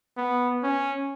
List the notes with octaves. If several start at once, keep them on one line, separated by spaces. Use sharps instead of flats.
B3
C#4